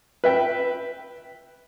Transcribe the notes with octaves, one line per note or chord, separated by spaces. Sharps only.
B4 E5 G5